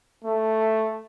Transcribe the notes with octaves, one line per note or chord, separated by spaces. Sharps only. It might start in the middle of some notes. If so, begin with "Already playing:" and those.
A3